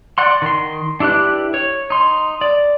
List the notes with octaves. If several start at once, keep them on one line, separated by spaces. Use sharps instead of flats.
D5 F#5 C6
D#3 C6
D4 E4 G4 B4 F#6
C#5
D#4 C6
D5